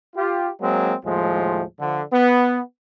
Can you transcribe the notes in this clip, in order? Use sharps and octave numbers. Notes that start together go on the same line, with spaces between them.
F4 G4
F#3 G#3 A#3 C4
D#2 A2 F3 G#3
D3 F3
B3